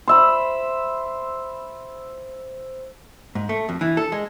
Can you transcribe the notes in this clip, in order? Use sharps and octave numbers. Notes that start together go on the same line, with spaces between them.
C5 E5 B5
G#2
A3
F2
E3
A4
G#3